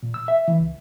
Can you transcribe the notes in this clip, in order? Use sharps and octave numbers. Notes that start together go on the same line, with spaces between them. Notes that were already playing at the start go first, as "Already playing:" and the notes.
A#2
E6
E5
E3
C#2